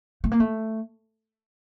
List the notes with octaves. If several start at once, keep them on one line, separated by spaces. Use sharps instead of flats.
A3
A#3
A3